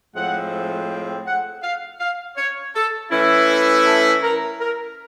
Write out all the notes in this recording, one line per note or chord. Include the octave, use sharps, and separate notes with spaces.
A2 F3 G#3 C4 F#5
G5
F#5
F5
F5
C#5
A4
E3 A3 C#4 E4
A4
A#4
A#4